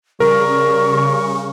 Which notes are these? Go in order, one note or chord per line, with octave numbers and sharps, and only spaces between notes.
C#3 G3 A#4 C#6